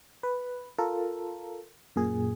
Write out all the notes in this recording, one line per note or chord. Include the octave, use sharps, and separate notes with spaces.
B4
F4 A4 A#4
F#2 A#2 G#4